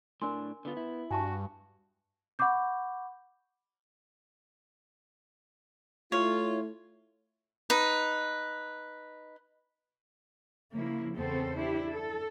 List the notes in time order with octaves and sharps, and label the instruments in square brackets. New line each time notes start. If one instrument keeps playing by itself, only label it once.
[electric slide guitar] A2 D4 [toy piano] A#4 G#5 C6
[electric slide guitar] D3 F4 [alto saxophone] B3
[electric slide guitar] E4
[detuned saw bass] G2 [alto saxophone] F#4 [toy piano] G#5 A5 C#6
[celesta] F#5 B5 C#6 D6 G6
[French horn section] A3 E4 [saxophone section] F4 [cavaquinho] C#5
[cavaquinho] D#4 B4
[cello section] C#3 F3 A#3 E4
E2 C#3 B3 C4 A4 C5
D4 E4 G4
A4